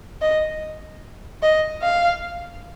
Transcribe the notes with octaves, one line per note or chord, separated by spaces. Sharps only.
D#5
D#5
F5